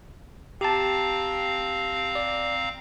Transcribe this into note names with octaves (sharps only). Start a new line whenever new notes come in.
C4 G4 F5 A5 A#5
D5